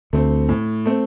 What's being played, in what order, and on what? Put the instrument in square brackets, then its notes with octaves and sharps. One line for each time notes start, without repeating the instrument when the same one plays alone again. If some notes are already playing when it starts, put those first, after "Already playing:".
[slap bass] D2 D3 [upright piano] A3 C4
[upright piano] A2
A3 C4